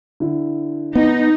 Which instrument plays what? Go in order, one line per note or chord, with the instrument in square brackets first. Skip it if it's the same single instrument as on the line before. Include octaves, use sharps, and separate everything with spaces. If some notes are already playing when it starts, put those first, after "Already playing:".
[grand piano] D3 E4
[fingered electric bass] B3 [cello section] D#4